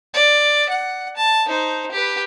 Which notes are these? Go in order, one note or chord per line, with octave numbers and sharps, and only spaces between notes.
D5
F#5
A5
D#4 C5
G4 B4